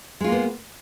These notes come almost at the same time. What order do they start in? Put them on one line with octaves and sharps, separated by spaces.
G#3 F4 A#3 B3